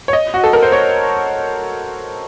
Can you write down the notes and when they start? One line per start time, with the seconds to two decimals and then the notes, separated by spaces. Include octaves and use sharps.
0.08 C#5
0.13 D#5
0.34 F#4
0.44 A4
0.53 A#4
0.62 C5
0.72 C#5